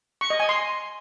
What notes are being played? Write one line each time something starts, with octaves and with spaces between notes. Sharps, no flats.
C#6
D#5
G#5
C6